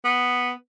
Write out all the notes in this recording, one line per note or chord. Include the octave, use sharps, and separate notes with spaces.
B3